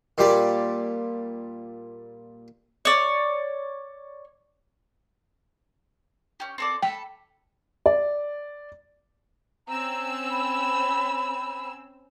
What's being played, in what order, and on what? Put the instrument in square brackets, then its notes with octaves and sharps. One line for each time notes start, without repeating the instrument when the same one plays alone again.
[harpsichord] A#2 G3 D5
[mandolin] C#5 D5
C#4 G4
C4 A4 D5
[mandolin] A4 B5 [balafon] G5
[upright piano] D5
[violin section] C4 C#4 E6 [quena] A#5
[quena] B5